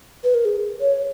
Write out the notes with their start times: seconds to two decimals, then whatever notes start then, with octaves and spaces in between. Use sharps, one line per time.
0.24 B4
0.34 A#4
0.45 G#4
0.81 C#5